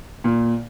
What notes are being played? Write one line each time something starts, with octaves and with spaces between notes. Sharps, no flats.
A#2